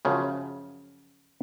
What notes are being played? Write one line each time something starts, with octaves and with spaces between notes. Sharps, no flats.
F#2 C#3 F3